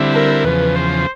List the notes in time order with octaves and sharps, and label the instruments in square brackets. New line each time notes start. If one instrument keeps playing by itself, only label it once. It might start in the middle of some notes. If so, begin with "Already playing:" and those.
Already playing: [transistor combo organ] D3 G3 C4 E4
[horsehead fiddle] A#4
[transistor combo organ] E2 C#3 F3 [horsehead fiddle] B4
[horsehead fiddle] C5